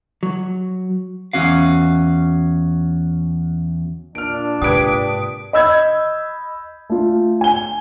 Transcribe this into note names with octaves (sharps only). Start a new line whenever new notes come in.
F#3
E2 C#4 F#4 F5
A#2 D4 F6 D7
G#2 C3 G4 B4 D#6 G#6 D7
D#5 B5 E6 G6 G#6
A3 F4
G#5 G7